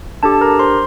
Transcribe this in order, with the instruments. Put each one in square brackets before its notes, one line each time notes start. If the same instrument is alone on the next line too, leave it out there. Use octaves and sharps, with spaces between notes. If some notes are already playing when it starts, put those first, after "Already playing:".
[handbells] D4 G4 A4 A5
A#4 A#5
C5 C6